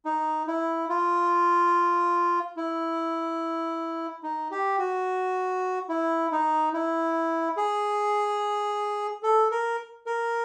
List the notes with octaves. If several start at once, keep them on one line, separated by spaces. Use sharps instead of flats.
D#4
E4
F4
E4
D#4
G4
F#4
E4
D#4
E4
G#4
A4
A#4
A#4